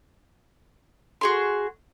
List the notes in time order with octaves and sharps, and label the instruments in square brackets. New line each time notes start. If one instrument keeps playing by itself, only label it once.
[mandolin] F#4 G#4 C6